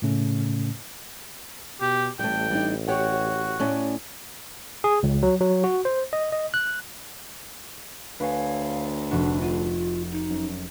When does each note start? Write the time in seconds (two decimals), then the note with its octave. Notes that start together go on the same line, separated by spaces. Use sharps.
0.02 A2 C#3 A3 C#4
1.81 B2 G4
2.19 A1 G3 A3 G5
2.51 G3 D4 D#4
2.88 F#4 G4 C#5 F#5
3.60 A2 C#4 D5
4.84 G#4
5.03 C#2
5.23 F#3
5.40 F#3
5.64 F#4
5.85 C5
6.13 D#5
6.32 D#5
6.54 F#6
8.20 D2 B4 C#5 F5 G#5
9.11 F1 D4 F#4
9.40 F4 C7 D#7
10.11 D#4
10.30 F#2